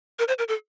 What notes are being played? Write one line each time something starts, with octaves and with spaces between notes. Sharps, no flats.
A#4
C5
A#4
A4